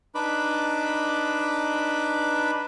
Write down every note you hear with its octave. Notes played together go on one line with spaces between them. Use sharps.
D4 D#4 B4 B5 D6